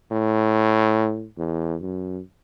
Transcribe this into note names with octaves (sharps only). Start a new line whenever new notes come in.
A2
E2
F#2